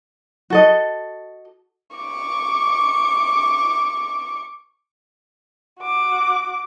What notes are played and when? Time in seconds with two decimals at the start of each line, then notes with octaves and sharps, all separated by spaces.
0.50 F#4 A4 D#5
1.97 C#6 D6
5.80 F#4 D6